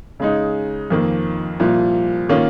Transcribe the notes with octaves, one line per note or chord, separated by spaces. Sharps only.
C#3 G#3 D#4
F2 D#3 A#3
C2 A#2 F3
D#3 A#3 C#4 F4